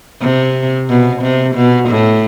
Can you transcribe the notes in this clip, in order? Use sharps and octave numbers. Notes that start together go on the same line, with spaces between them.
C3
B2
C3
B2
A2